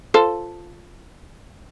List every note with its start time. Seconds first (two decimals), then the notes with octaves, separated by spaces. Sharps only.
0.14 F4 A4 C5